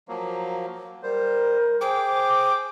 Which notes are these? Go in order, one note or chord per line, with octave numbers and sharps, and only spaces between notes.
F3 F#3 A#3
G3 A#4 C5
G#4 C5 G5 D6